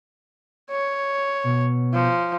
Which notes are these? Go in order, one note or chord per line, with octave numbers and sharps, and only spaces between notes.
C#5
B2
F3